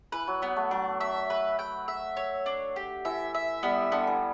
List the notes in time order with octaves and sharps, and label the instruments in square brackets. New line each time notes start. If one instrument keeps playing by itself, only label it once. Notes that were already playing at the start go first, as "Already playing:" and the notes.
[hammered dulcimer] E3 [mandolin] B4
[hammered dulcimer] F#3
[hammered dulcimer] F#3 [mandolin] B3
[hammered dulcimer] A3
[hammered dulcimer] F#3 [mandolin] D4
[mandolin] E5
B4
G5
E5
C#5
D4
G4
[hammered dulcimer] E3 [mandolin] E5
[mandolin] E5
[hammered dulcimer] G3 [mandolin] B3
[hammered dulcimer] D3 [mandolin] B3
[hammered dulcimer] E3